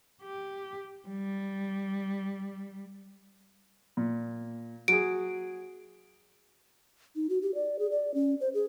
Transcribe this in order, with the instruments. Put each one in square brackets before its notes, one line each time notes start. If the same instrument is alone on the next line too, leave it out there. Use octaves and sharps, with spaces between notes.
[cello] G4
G3
[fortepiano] A#2
[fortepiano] F#3 G#4 [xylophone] D7
[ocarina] D#4
F#4
G4
D5
G#4
D5
C#4
C5
G#4